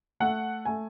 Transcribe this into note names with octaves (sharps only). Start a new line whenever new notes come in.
A3 F#5
A3 G#5